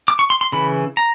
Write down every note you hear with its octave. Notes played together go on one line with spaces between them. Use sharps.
D6
C#6
C6
C6
C#3 E3 B5
A#5